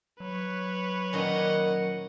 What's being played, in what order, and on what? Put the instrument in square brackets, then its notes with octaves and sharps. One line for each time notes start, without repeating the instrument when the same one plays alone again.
[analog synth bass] F#3 [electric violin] B4 C#5
[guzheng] A#2 D#3 C#4 [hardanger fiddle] D#5 F#5